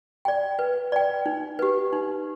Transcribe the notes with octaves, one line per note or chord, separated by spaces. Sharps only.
D5 G5
B4
D5 G5
D#4
G4 B4
D#4